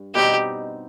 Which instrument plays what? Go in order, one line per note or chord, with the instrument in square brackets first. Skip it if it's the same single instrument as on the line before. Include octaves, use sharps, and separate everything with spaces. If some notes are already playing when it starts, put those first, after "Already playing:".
Already playing: [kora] G2
[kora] B2 G3 C4 D#4 [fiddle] G4